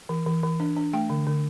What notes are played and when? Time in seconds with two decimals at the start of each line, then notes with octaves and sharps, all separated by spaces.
0.09 E3
0.26 E3
0.43 E3
0.60 D4
0.77 D4
0.93 A3 G5
1.10 D3
1.27 D3